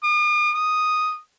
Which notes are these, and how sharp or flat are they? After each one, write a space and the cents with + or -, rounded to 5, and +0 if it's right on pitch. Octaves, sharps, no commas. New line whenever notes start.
D#6 -45
D#6 +0